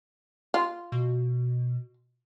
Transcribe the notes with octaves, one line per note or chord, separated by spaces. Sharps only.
F4
B2